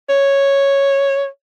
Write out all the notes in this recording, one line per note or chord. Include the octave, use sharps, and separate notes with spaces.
C#5